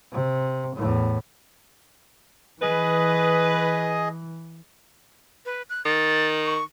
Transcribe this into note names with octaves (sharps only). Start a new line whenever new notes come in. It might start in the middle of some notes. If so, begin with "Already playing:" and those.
C3
E2 A2
E3 G#4 B4 D#5
B4
F#6
D#3 A6
C#6